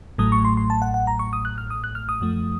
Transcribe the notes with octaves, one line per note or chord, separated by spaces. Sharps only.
A1 A2 F#3 A3 D#6
C#6
C6
C6
A5
F#5
F#5
A#5
C#6
D#6
F#6
F6
D#6
F#6
F6
D#6
F#2 F3 A3